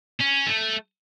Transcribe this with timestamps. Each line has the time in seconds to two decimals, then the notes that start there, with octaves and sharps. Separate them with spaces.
0.20 C#4
0.46 A3